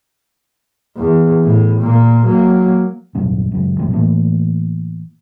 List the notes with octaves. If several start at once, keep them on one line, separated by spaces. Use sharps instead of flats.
E2
A2
A#2 A#3
F#3 A#3
D#1 C2 F#2 C3
C#2 F#2
A#1 F#2 C3 F3
A2 E3 A#3